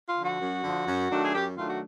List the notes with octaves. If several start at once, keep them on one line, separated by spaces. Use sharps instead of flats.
F4
D3 F3
F#4
F#2
D3 F3
F#2
D#3 F#3 A3 D4
G#4
F#2 G4
D#3 F#3 A3 D4 F4
F#4